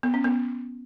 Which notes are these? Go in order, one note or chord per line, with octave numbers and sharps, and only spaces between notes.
B3
C#4
B3